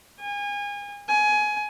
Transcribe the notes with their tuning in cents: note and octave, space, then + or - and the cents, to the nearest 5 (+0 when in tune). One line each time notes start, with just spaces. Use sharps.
G#5 -30
G#5 +20